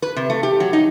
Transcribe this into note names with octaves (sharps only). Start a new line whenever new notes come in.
B4
C3
A3
G4
F#3
D#4